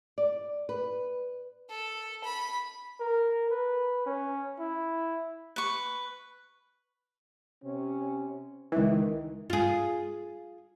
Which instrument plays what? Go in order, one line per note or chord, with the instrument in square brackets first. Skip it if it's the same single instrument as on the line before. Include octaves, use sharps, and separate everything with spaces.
[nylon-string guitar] D5
B4
[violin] A4
B5
[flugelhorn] A#4
B4
C#4
E4
[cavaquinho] B4 C#6
[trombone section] C3 C#4
[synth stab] C#2 E3 [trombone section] D#3
[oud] F4 G#4